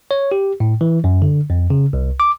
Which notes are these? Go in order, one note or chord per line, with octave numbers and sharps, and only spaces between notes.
C#5
G4
A2
E3
F#2
D3
F2
C#3
C2
D6